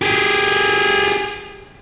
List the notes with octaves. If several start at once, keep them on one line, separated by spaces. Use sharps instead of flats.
G4 G#4